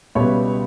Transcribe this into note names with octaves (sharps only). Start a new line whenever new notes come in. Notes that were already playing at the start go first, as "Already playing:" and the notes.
C#2 B2 G3 B3 C#5 E5